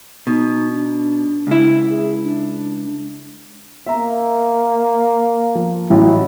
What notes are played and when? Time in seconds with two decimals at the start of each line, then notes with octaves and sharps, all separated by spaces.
0.27 B2 D#4
0.72 D4
1.47 C#2 E4
1.90 G#4
2.23 D4
3.86 A#3 E5 A#5
5.55 F3
5.90 A1 F#3 E4